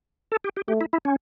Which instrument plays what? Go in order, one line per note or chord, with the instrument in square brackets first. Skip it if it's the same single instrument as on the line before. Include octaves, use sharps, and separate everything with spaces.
[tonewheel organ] A4
G4
G4
[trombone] A3 [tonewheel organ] G4
[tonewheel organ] E4
E4
C#4